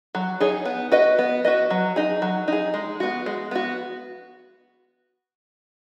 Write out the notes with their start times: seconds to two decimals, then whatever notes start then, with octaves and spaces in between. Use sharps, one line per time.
0.15 F#3
0.40 D#4 G#4 C#5
0.65 B3
0.92 F#4 B4 D#5
1.19 B3
1.45 F#4 B4 D#5
1.70 F#3
1.96 D#4 G#4
2.22 F#3
2.48 D#4 G#4
2.74 G#3
3.00 B3 F#4
3.26 G#3
3.51 B3 F#4